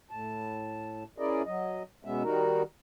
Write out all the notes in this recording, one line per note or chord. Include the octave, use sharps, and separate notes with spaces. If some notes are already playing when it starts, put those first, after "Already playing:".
A2 A5
C#4 E4 G#4 A#4 D5 D#5
F#3 D#5
B2 G#3 B3 C#4 E5
D#3 G3 D#4 F#4 A#4